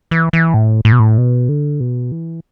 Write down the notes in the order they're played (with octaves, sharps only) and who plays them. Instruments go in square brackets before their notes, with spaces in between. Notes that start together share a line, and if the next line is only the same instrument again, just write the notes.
[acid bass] E3
E3
A2
A2
B2
A2
B2
D3
B2
E3